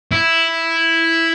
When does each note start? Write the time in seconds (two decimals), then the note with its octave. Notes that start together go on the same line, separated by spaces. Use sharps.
0.12 E4